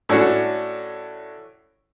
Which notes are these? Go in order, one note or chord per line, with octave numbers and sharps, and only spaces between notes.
A2 C#4 D4 F#4 A4